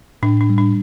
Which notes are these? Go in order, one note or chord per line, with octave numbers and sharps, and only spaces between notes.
A2 D4
D4
G3
D4